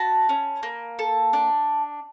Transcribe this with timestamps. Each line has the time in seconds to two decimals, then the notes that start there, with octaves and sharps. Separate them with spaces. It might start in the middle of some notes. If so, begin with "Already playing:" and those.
Already playing: F#4 A5 B5
0.29 C#4
0.63 A#3
0.99 A4
1.33 D4